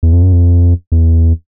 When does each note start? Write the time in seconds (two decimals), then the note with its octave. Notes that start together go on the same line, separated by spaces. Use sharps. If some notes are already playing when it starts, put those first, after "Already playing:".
0.03 E2
0.13 F2
0.23 F#2
0.33 F2
0.92 E2